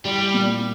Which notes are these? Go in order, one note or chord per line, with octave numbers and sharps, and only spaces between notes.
G3 E4
A#2